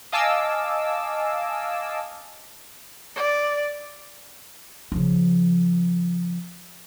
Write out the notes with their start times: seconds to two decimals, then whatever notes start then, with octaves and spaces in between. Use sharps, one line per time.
0.12 D#5 F5 G#5 A5 D6 E6
3.16 D5
4.92 C#3 F3